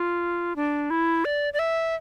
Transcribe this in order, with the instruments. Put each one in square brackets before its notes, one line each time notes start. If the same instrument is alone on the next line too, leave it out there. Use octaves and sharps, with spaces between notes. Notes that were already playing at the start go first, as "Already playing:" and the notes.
Already playing: [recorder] F4
D4
E4
D5
D5
E5